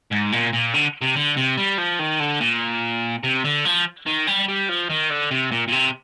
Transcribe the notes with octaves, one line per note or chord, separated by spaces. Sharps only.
G#2
A#2
A#2
D3
C3
D3
C3
G3
F3
D#3
D3
A#2
C3
D3
F3
D#3
G3
G3
F3
D#3
D3
C3
A#2
A#2
C3